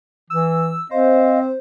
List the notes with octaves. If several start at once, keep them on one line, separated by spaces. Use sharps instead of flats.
E3 E6
C4 C5 D#5 F5